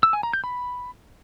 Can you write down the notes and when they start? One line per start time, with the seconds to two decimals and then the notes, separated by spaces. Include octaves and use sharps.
0.03 E6
0.13 G#5
0.23 A#5
0.33 G6
0.44 B5